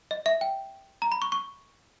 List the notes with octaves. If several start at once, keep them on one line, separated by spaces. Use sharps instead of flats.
D#5
E5
G5
A#5
B5
C#6
C#6